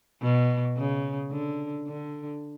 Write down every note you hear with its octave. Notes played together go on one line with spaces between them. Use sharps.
B2
C#3
D3
D3